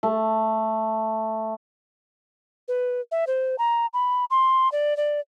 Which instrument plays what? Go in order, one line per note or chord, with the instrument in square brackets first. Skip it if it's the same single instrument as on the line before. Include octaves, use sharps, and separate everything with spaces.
[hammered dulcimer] A3
[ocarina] B4
E5
C5
A#5
B5
C6
D5
D5